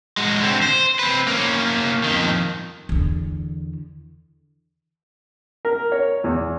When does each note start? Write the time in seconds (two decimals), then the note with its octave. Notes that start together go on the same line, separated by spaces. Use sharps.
0.17 G#3 F#4
0.43 D3 C4
0.62 C5
0.99 C4 B4
1.28 A#3 C#4
2.03 F2 D#3
2.89 E2 D3
5.65 A#4
5.92 C#5
6.24 E2